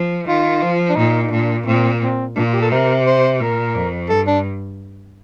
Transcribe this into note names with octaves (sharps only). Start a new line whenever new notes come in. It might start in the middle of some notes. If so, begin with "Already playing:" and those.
Already playing: F3
D#3 F4
F3
D4
A#2 D#4
D#4
A#2 D4
A#2 C4
C4
A#2 D4
F4
G4
A4
C3 A#4
C5
A#2 A#4
F2
G2 A4
D4